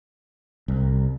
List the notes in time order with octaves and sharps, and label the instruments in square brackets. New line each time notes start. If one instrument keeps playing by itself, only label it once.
[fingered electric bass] C2